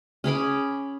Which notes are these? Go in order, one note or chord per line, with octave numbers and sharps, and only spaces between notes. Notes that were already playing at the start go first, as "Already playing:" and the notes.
C#4 G#4 B5 D6